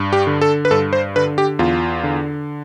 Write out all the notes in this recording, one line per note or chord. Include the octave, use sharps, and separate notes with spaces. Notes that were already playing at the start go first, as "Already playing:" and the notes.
Already playing: G2
G4
D3
A4
B4
G2 A4
C5
D3 B4
G4
E2 F4
D3